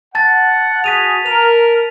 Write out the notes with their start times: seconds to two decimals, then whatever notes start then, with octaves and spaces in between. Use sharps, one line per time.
0.15 F#5 A5 A6
0.84 F#4 G#4 B6 D#7 F7
1.26 A#4 F7